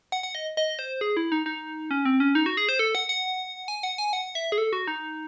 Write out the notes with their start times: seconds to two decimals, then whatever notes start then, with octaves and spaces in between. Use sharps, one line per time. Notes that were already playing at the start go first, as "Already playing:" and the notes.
0.12 F#5
0.23 F#5
0.35 D#5
0.57 D#5
0.79 C5
1.01 G#4
1.17 E4
1.32 D#4
1.46 D#4
1.91 C#4
2.05 C4
2.20 C#4
2.35 D#4
2.46 F#4
2.57 G#4
2.69 C5
2.79 A4
2.95 F#5
3.09 F#5
3.68 G#5
3.83 F#5
3.98 G#5
4.13 F#5
4.35 E5
4.52 G#4
4.58 A4
4.73 F#4
4.87 D#4